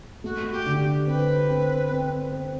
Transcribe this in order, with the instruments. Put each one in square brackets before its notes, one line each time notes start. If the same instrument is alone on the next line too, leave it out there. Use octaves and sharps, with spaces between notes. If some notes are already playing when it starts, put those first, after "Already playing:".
[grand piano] A3 [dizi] F#4
[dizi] G4
[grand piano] D3
[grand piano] C4 [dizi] B4
[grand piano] C4
C4
C4